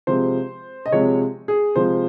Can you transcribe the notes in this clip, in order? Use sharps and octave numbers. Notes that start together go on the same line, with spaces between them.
C3 F3 G#3 C5
D#5
C3 F3 G#3 C#5
G#4
C3 F3 G#3 C5